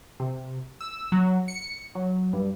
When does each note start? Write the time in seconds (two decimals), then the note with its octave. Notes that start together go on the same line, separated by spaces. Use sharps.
0.20 C3
0.81 E6
1.12 F#3
1.48 C#7
1.95 F#3
2.33 G2